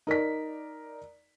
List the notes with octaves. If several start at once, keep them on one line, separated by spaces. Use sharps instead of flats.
D#4 A#4 D5 B6